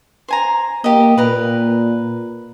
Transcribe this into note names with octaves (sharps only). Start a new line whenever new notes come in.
C5 G#5 A#5
A#3 G4 D#5
A#2 A#4 B4